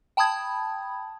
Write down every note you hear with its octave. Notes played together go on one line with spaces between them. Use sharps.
G5 A5 B5 D#6 G#6